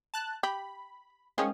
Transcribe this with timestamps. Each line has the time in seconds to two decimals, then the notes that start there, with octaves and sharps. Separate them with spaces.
0.14 A5 F#6
0.43 G4 B5
1.38 D#3 F3 G#3 C#4 G#4